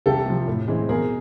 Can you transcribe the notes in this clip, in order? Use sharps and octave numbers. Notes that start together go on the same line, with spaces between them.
C2 G4 A4
C3 F3
A2
E3 G#3 C4
B2 G#4 A#4